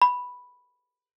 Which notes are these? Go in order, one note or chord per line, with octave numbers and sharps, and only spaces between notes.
B5